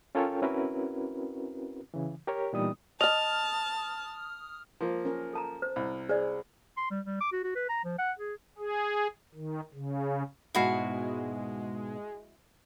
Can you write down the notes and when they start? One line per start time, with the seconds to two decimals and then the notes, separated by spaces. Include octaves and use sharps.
0.15 C#4 F4 A4 A#4 C#5 G5
0.42 C4 C#4 E4 F#4 A#4 B4
1.94 C#3 E3
2.27 G4 A#4 C#5
2.53 A#2 E3 G3 B3 D#4 D#6
3.01 D5 D#5 A5 D#6 F6 F7
4.81 F3 A#3
5.05 C#4 A#4
5.33 A4 A5 A#5
5.62 C5
5.76 C2
6.09 G#4 C5 D5
6.77 C6
6.91 G3
7.06 G3
7.21 D6
7.33 F#4
7.44 F#4
7.56 B4
7.69 A#5
7.85 F3
7.99 F#5
8.19 G#4
8.58 G#4
9.35 D#3
9.74 C#3
10.55 G#2 B2 G#3 E4 F#4 F5